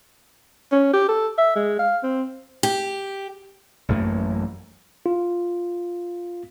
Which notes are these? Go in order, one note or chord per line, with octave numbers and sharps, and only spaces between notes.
C#4
G4
A4
E5
G#3
F5
C4
G4
A1 F#2 A3 A#3
F4